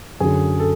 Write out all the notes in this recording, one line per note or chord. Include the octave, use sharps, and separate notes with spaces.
F#2 D3 F#3 G#4
A4